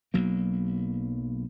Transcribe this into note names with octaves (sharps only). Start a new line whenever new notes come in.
B1 F#3 A#3